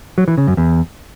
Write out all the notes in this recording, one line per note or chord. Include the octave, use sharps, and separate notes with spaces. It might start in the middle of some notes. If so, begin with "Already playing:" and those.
F#3
E3
C#3
F#2
E2